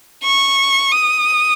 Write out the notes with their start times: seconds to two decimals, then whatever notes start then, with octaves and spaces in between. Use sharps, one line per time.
0.23 C#6
0.92 D#6